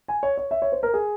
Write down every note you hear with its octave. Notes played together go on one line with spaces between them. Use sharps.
G#5
C#5
C#5
E5
C#5
C5
A#4
G#4